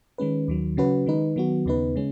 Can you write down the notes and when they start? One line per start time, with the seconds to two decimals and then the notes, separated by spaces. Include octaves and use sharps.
0.18 D#3 G#3 C#4 B4
0.48 D#2 D#3 F#3
0.77 C#3 F#3 C#4 F#4 B4
1.06 D#3 G#3 D#4 B4
1.36 D#3 F#3 B3 F#4
1.66 D#2 C#3 B3 D#4 B4
1.96 C#3 G#3 C#4